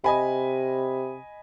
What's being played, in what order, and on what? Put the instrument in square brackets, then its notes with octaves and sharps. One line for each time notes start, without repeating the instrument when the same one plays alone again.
[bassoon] C3 [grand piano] D#5 G#5 B5